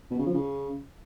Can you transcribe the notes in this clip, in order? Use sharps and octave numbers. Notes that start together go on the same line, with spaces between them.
B2
C#3
F3
C#3